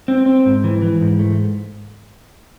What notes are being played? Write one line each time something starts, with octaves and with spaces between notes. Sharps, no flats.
C4
C4
G#2
E3
E3
G#2
A3